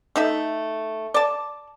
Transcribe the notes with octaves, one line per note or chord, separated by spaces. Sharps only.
A3 D#4 E5
D5 A5